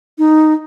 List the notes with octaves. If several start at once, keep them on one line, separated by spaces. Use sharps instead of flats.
D#4